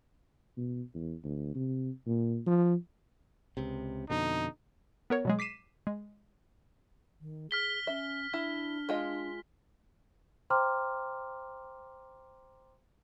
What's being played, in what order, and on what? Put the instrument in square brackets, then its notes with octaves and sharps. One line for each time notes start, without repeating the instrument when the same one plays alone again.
[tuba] B2
E2
D2
C3
A#2
F3
[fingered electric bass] C#2 C3
[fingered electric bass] F2 B2 D3 [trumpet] D#4
[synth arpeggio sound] B3 A#4 C#5
B2 F#3 G#3
D6 B6 C7 D#7 E7
G#3
[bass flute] D#3
[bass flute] G#4 [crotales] F6 B6 G7
[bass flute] C#4 [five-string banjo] E5
[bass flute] D4 [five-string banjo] E4
[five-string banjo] G#3 F4 D#5
[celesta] C5 G5 A#5 C6 D6 F6